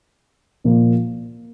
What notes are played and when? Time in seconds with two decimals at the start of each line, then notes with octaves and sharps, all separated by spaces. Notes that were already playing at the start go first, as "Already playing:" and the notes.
0.64 A#2 F3 A#3